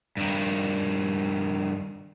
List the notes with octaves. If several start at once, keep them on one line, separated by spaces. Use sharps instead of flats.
G2 D#3